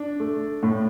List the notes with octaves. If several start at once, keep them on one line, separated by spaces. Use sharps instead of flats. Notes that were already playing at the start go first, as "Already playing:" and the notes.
Already playing: D4
A3
A2